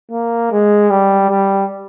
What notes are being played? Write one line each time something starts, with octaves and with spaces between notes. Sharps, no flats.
A#3
G#3
G3
G3